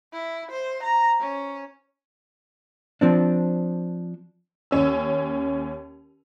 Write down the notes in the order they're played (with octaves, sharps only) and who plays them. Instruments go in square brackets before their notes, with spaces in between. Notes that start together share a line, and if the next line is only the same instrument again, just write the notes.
[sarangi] E4
C5
A#5
C#4
[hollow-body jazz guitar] F3 C4 D4
[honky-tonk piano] D#2 C#4 E6